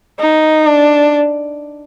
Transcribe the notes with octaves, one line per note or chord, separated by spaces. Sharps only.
D#4
D4